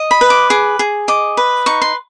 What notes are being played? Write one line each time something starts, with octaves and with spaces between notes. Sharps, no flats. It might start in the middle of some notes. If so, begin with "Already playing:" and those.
Already playing: D#5
B5
B4
D6
G#4 D6
G#4
D#5 D6
B4
D#4 C#6
C6